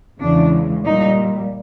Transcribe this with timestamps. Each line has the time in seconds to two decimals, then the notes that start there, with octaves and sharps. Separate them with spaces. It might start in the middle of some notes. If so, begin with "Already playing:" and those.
0.19 E2 C#3 E3 G#3 D4
0.85 A#2 G3 D#4